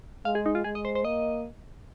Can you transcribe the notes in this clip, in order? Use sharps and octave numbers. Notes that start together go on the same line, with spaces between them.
G#3 F5
G#4
D#4
F4
G#3 G#4
D#5
C5
C5
A#3 D#5